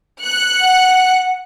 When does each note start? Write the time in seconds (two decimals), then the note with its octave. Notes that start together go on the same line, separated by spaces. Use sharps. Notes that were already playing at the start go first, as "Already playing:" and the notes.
0.23 F#6 C#7
0.60 F#5